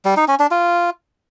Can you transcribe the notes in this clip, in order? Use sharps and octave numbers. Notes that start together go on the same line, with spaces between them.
G3
D#4
C#4
D4
F4